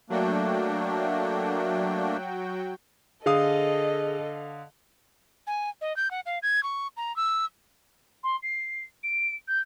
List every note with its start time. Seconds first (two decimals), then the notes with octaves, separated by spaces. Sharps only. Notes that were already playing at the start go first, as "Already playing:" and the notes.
0.10 F#3 A3 A#3 D4 F#4 G5
3.26 D3 G#4 A4 D#5 F5 D#6
5.47 G#5
5.81 D#5
5.97 G6
6.11 F#5
6.26 F5
6.43 G#6
6.63 C#6
6.97 A#5
7.16 E6
8.23 C6
8.42 C7
9.03 D7
9.47 G6